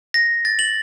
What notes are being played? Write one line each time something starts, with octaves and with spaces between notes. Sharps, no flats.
A#6
A6
F#7